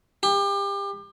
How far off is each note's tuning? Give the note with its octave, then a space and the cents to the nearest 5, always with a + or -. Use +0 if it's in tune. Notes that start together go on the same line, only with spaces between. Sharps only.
G4 +30